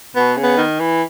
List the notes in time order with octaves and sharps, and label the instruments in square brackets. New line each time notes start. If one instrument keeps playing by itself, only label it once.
[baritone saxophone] B2 [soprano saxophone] B3
[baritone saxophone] C#3
[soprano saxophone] B3
[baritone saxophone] D#3
E3